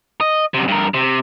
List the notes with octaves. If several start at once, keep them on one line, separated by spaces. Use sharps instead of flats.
D#5
F#2 C3
G2 A#4
C3